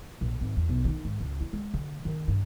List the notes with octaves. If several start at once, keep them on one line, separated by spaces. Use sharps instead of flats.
A#1
G#1
E2
B1
D#3
G#2
C#2
E4
G#3
D3
D#3
G2